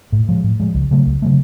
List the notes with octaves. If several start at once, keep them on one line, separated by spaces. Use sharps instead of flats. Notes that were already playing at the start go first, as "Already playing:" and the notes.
A2
F3 G#3
A2
F3 G#3
C#2
C#3 F#3 A3
C#2
C#3 F#3 A3